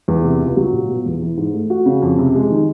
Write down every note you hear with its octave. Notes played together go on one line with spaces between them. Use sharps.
E2
C3
C#2
F#3
A#2
B2
E2
E3
G#2
A3
F#4
C#3
F2
C3
G#3
D#3